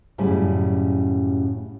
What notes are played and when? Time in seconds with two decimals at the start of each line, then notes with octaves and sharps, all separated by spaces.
0.18 F#2 A2 C#3 G3